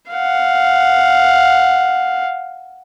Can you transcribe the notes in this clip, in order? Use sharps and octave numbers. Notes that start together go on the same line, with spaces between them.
F5 F#5